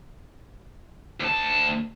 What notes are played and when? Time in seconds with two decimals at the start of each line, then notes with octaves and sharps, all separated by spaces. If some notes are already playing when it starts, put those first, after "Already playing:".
1.20 D2 A5